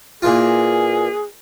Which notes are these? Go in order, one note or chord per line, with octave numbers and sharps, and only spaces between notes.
A#2 E3 F4 G#4